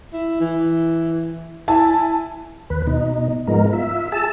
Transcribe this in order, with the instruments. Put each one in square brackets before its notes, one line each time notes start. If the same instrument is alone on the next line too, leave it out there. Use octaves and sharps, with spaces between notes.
[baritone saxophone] E4
E3
[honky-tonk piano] E4 G#5 A5
[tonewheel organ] D#2 B4
B2 D#4
G#2 F3 G#3 B3 D#4 A#4
F4 E5
G#4 A5 E6